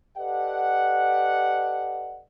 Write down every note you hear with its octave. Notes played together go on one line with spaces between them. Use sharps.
G4 A4 B4 D5 D#5 F#5